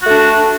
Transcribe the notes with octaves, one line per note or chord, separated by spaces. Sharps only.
A3 D4 F#4